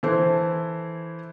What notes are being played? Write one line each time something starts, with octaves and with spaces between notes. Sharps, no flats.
E3 E4 A4 C5